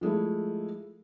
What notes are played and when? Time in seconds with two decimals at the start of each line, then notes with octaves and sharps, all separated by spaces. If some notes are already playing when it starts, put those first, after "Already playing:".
0.01 F3 G#3 A3 E4